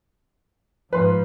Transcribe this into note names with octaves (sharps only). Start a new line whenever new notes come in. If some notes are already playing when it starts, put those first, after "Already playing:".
G#2 F3 B4 C6